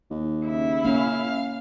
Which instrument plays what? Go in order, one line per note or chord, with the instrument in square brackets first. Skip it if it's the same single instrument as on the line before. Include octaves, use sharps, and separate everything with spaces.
[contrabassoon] D#2
[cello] C#3 E4
[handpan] A#3 C#4 [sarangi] F5